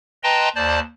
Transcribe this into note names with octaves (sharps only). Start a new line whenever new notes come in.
B4 D#5 G5 A5 A#5 C6
D#2 C5 D5 A5